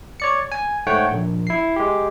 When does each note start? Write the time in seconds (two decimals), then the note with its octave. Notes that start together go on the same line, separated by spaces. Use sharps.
0.20 C#5 D5 C#7
0.52 G#5
0.87 G#2 A3 C#5 F#5 G5
1.11 A#1
1.47 E4 C7
1.76 G#3 G4